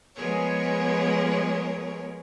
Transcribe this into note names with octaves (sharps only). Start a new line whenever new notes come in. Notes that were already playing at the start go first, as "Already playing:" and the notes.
F3 G#3 B3 G#4 A#4 C#5